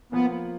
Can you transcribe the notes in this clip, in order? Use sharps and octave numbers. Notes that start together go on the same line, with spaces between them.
F3 A#3 B3